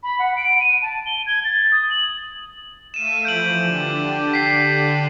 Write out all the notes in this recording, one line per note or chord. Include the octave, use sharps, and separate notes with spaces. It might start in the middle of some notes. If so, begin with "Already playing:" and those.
B5
F#5
D7
D#7
A5
G7
G#6
A6
D#6
F#7
A3 E5 F5 D#7 E7
E3 F3 G6 D7 F#7
D3 D4 G4
B6 C7